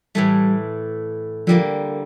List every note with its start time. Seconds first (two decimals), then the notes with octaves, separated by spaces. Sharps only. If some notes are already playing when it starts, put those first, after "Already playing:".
0.15 A2 E3 G3 A3
1.47 D3 F3 G3 A#3